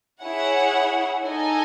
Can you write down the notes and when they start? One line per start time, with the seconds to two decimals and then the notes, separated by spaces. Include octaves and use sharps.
0.21 E4 G#4 C#5 F#5
1.26 D#4 A4 D#5 G#5